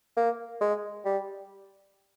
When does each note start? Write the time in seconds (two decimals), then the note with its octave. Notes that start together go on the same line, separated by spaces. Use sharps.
0.17 A#3
0.61 G#3
1.05 G3